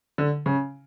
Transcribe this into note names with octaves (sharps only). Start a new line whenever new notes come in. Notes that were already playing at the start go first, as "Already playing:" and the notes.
D3
C#3